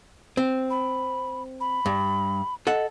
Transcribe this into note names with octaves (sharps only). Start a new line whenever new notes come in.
C4
B5
B5
G2
A4 D#5 F#5